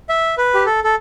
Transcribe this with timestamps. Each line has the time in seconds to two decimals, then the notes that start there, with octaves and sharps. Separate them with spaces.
0.09 E5
0.38 B4
0.54 G4
0.66 A4
0.84 A4